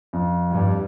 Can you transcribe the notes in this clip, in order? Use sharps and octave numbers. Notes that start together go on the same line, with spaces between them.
F2
G2